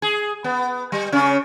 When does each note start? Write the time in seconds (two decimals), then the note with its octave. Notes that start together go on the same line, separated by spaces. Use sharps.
0.02 G#4
0.44 B3
0.92 G3
1.12 C#3 C#4